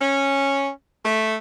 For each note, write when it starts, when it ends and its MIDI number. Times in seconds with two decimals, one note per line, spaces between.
0.01 0.68 61
1.04 1.35 57